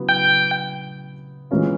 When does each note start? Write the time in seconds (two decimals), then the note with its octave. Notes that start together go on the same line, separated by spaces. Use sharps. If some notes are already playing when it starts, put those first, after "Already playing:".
Already playing: C#3 F#3 B3 E4
0.09 G5
1.51 E3 G#3 C#4 F4 A#4